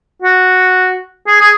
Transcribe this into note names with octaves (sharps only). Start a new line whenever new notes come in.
F#4
G#4
G#4